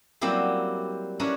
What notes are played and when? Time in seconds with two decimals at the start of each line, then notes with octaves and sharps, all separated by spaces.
0.21 F#3 G3 A#3 C4 E4 G4
1.20 C#4 D4 E4 A#4 B4 C#5